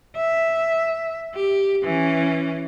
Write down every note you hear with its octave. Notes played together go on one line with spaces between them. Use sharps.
E5
G4
E3 C#4